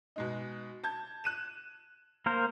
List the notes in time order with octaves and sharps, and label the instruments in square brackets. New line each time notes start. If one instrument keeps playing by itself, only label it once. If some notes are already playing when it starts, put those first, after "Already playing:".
[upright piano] B2 G#3 D#4
A5 G6 G#6
F#6 D#7 E7
[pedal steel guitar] A#3 A#4 C5